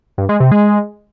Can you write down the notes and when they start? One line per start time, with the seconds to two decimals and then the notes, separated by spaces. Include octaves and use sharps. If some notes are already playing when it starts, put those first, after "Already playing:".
0.18 G2
0.29 G#3
0.40 C3
0.51 G#3